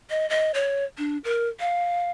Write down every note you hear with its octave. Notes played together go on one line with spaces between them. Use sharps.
D#5
D#5
C#5
D4
A#4
F5